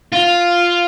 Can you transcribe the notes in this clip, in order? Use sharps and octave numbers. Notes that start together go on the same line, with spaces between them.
F4